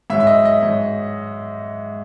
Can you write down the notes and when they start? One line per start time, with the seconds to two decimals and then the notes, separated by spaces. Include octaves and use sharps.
0.10 G#2 F#3 E5
0.20 E5
0.27 D#5
0.45 D#5
0.63 G#2 F#3